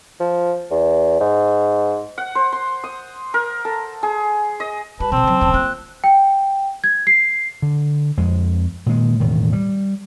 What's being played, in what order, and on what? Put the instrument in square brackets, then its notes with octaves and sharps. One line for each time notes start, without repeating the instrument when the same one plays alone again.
[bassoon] F3
E2
G#2
[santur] F#5
C5
C6
D#6
A#4
A4
G#4
D#5
[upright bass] G3 [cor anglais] B4 [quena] A5
[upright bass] B2 D#3 [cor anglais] C4
[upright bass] C#3 F#3
D1 C#3
[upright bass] A#3 F4 [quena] F#6
[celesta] G5
G#6
C7
[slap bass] D3
F2 G#3
A#2 D#3 G3 G#3
E1 A2 D#3
G3